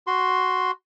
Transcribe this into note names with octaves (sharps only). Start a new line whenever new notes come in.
F#4 C6